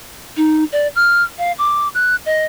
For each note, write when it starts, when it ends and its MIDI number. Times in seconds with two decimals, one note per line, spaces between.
0.37 0.64 63
0.72 0.88 74
0.96 1.23 89
1.39 1.52 77
1.59 1.89 86
1.94 2.16 90
2.26 2.46 75